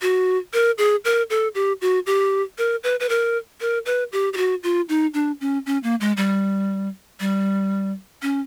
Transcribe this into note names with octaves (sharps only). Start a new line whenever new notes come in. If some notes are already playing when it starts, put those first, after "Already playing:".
F#4
A#4
G#4
A#4
A4
G4
F#4
G4
A#4
B4
B4
A#4
A#4
B4
G4
G4
F#4
F4
D#4
D4
C#4
C#4
A#3
G#3
G3
G3
C#4